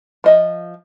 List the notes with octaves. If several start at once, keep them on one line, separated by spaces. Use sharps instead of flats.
F3 D#5 E5